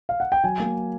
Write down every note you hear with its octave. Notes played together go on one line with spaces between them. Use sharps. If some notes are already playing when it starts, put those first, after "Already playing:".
F5
F#5
G5
F#3 G#5
A#3